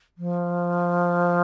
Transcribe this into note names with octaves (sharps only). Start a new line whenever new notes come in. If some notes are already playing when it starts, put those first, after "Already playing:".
F3